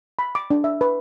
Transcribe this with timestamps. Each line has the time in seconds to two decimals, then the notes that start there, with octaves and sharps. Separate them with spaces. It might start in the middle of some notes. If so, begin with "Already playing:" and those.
0.19 B5
0.35 D6
0.51 D4
0.64 E5
0.81 B4